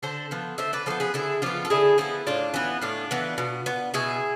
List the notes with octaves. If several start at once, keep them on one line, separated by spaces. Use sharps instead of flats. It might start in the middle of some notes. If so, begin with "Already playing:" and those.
D3 A4 C5
F3 B3
D3 C5 E5
B4 D5
F3 B3 A4 C5
G#4 B4
D3 E4 G#4
F3 B3 D4 F4
A4
D3 E4 G#4
F3 B3 C4 E4
A2 D4 F4
E3 B3
A2 D4 F4
E3 B3
B2
B3
B2 E4 G#4